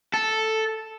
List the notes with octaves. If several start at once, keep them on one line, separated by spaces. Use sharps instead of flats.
A4